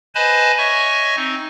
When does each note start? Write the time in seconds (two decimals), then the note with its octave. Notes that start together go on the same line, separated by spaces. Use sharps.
0.15 B4 C5 D#5 G#5 A5 B5
0.58 C#5 D#5 E5 G#5 C#6
1.16 C4 D#4